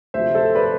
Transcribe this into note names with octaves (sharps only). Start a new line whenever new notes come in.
D2 C3 F3 C5 E5
A4 C5
B4 D5